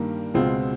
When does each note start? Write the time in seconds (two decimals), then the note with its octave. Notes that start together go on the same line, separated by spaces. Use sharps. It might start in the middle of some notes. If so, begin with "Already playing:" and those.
Already playing: G2 D#3 G3 A#3
0.34 C#2 B2 G#3 C4 F4